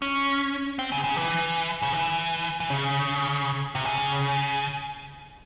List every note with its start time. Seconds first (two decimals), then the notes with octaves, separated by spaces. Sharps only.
0.02 C#4
0.79 C4
0.92 C#3
1.04 C#3
1.16 E3
1.82 C#3
1.93 E3
2.60 E3
2.70 C#3
3.75 C3
3.85 C#3